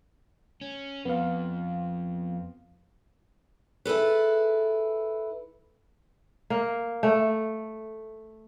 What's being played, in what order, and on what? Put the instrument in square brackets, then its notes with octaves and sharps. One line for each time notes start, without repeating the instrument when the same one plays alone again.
[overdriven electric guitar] C#4
[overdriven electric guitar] F2 [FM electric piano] B3 F5
[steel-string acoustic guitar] E4 G#4 A4 B4
[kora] A#3
A3